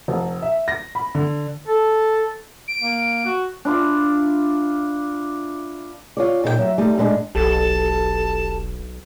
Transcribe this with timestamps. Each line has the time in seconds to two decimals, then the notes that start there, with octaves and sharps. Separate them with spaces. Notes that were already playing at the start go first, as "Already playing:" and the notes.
0.08 F1
0.42 E5
0.68 A#6
0.95 B5
1.15 D3
1.68 A4
2.68 D7
2.82 A#3
3.25 F#4
3.65 D4 E4 F4
6.17 F4 C#5 D5
6.44 A#2 D#4 A#4 G5
6.58 F#3 E5
6.78 G3 A3 D#4
6.98 A2 D3 G#3 D4
7.35 E1 B1 G4 A4 A5